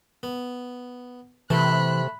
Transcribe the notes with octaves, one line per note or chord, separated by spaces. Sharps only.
B3
C3 E3 A3 A5 B5 F#6